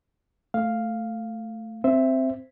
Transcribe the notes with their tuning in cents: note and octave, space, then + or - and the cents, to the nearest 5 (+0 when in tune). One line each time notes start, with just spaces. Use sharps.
A3 +0 F5 +0
C4 +0 C5 +0 E5 +10